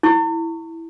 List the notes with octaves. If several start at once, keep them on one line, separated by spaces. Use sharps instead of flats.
E4 C#6